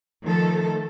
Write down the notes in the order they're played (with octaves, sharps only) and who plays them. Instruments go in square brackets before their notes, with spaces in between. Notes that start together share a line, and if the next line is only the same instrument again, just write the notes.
[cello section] D#3 F3 A3 A4